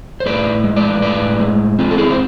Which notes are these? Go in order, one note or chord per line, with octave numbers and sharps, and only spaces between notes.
C5
A2 B4 D5
G#3
B4 D5
A2 B4 D5
G#3
C4 F4
A4
E4 G#4
C5